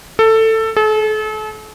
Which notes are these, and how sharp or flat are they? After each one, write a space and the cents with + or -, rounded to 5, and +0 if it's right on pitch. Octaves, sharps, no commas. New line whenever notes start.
A4 +15
A4 -40